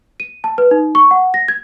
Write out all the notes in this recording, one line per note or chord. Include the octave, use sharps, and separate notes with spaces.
D#7
A5
B4
D#4
C#6
F#5
A#6
G#6